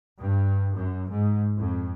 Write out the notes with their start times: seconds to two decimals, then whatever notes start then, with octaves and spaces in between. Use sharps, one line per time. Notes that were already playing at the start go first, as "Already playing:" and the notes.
0.20 G2
0.76 F#2
1.09 G#2
1.57 F2